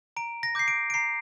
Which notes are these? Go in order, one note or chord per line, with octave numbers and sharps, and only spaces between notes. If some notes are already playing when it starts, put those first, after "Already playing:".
A#5 D7
A#6
D6 G6 C7
D7
D7
A#5 C7